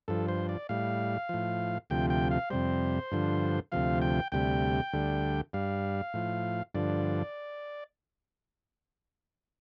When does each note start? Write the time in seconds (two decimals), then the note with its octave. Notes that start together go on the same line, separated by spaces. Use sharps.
0.08 G2 F3 A4
0.28 C5
0.49 D5
0.69 A2 G3 F5
1.29 A2 F3
1.90 D2 C3 F3 G5
2.10 G5
2.31 F5
2.50 F2 C3 G3 C5
3.12 G2 D3 F3
3.72 D2 C3 F3 F5
4.02 G5
4.32 D2 C3 G3 G5
4.93 D2 D3 G3
5.53 G2 G3 F5
6.14 A2 F3
6.74 G2 D3 F3 D5